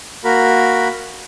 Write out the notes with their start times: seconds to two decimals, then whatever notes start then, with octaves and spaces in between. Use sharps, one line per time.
0.24 A#3 F#4 A#4 B5